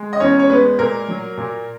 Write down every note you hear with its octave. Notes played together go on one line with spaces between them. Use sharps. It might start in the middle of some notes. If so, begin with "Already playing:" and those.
Already playing: G#3
D#5
E2 C#4 C#5
C#5
G#3 B3 B4
A#2 A#3 A#4
F#3
A#2